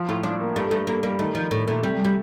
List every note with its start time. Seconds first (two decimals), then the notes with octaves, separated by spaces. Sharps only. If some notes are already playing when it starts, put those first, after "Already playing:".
Already playing: F3
0.09 A2 F4
0.23 F3 D4
0.40 A#3
0.56 G2 A3
0.71 G2 A3
0.87 G2 A#3
1.03 G3 A#3
1.19 D#3 A3
1.35 D#3 F3
1.51 A2 A3
1.67 A#2 A3
1.83 C3 G3
2.05 G3